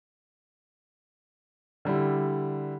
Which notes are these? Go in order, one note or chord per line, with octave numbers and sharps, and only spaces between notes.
D3 G3 E4